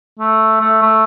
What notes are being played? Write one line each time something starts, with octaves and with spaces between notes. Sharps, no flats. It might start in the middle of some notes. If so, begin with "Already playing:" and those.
A3
A3
A3